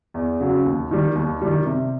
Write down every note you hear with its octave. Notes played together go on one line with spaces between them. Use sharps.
E2
C#3 F#3
D#2
D#3 G3
D#2
D#3 G3
C3